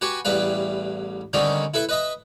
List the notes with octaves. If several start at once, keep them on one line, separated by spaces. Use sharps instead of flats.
F#4 G4 B4 G#5
A1 E2 G3 B4 F5
D3 D#3 G3 C4 C#4 D#4
E4 A4 B4 E5
B4 D#5 E5